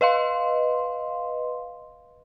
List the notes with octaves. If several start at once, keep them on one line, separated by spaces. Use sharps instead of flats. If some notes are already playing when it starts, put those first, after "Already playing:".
B4 D#5 F5 C6